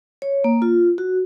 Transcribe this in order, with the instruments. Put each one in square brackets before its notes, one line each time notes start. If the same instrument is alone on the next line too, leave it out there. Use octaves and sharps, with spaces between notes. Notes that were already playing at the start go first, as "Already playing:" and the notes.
[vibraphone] C#5
A#3
F4
F#4